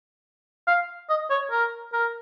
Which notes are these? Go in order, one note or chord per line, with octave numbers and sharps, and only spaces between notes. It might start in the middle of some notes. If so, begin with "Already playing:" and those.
F5
D#5
C#5
A#4
A#4